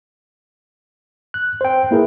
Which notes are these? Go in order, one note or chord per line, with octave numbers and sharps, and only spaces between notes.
F#6
C5 G5
A#3 E4 G#4 A#4 B4